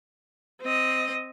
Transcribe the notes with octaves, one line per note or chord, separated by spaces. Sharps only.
C4 D#5